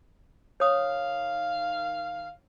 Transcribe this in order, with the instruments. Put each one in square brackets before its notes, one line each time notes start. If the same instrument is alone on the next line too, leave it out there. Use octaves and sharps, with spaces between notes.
[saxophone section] D#3 F5 [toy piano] C#5 D#6